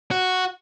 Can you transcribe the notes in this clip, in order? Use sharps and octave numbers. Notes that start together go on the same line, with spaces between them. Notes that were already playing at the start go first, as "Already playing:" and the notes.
F#4